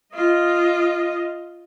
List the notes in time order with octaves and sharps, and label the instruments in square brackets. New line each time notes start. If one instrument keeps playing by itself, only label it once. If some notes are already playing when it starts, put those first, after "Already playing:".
[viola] F4 D#5